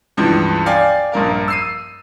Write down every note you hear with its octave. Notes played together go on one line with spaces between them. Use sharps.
C#2 G2 E3 F3
D5 F5 G5 G#5 D6
A#1 G2 A#4 F5
E6 C7 D#7